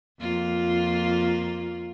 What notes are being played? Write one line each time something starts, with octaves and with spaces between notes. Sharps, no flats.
F2 A#3 F4